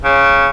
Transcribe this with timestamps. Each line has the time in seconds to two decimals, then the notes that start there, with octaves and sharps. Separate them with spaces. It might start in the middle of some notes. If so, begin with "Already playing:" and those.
0.04 C#3